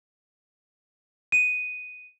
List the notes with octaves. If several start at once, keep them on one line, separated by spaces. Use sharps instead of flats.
D#7